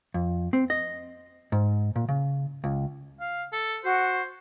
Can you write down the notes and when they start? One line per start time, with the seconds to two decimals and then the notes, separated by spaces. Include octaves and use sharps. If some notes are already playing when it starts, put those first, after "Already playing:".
0.14 F2
0.53 C4
0.70 D#5
1.52 G#2
1.96 A#2
2.09 C#3
2.64 C#2
3.20 F5
3.52 A4
3.84 F#4 C5